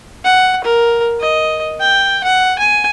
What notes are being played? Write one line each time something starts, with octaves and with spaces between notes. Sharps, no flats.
F#5
A#4
D#5
G5
F#5
G#5